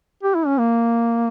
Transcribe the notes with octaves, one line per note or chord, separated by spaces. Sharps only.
G4
E4
C#4
A#3